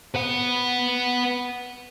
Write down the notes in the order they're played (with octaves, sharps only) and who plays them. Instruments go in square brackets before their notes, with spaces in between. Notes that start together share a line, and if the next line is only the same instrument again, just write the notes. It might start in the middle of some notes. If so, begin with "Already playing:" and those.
[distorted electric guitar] B4 F#5